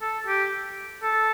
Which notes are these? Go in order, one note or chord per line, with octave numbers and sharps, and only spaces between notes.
A4
G4
A4